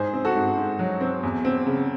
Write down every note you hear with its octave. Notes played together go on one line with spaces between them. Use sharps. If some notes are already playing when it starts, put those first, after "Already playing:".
Already playing: G#2 G#4 C5
C4
F#4 A4
G#2
G#2
F#3
C4
E2
C4
C#3